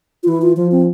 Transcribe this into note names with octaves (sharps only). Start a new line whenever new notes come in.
F4
E3 E4
F4
F3 F4
C4